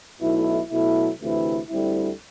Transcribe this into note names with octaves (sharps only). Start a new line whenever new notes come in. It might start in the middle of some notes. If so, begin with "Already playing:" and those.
B1 B2 A3 E4
B2 F#3 A3 E4
D2 C3 E3 A3 E4
D2 D3 G3 C4 E4